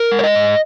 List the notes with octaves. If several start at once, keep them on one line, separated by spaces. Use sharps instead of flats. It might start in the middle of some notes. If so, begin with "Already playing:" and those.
Already playing: A#4
G#3
C#5
D#5
G#2